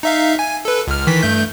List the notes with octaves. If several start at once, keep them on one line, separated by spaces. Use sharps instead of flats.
D#4 E5 F5
G#5
A4 B4
C#2 F6
D#3 E3 B6
G2 A3 G6